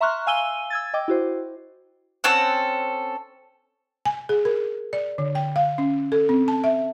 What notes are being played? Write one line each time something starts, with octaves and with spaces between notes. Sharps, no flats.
E5 A#5 C6 C#6 F6 F#6
F5 G#5 E6 D#7 G7
E6 G#6 A6
D#5 G5 D6
E4 F#4 C5
C4 C#4 A4 F#5
G#5
G#4
A#4
D5
D3
G5
F5
C#4
A4
C4
A5
E5